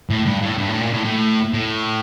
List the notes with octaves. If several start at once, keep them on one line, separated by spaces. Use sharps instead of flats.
A2
G2
A2
G2
A2
A#2
A2
A2
A2